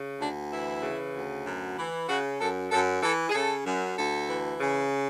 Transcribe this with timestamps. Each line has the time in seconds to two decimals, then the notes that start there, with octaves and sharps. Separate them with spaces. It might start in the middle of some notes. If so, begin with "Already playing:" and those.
Already playing: C#3
0.20 D2 D4
0.52 E3 E4
0.83 C#3
1.14 D2
1.46 F#2
1.78 E3
2.09 C#3 F#4
2.40 F#2 A4
2.72 F#2 A4
3.03 E3 A4
3.30 G#4
3.35 C#3 A4
3.66 F#2
3.98 D2 A4
4.29 E3
4.61 C#3